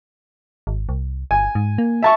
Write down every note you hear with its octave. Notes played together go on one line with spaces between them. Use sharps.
G#1
C2
G1 G#5
G#2
A#3
E5 A5 C#6